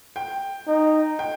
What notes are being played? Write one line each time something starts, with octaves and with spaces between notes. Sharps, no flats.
G5
D#4
G5